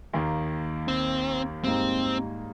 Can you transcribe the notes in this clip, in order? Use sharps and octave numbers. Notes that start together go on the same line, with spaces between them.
D#2 D#3 A#3
C4
G#2 G3 A#3 C4 D#4